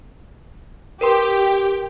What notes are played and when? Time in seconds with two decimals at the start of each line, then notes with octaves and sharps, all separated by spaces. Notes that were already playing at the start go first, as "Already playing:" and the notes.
1.01 G4 A#4 B4 C6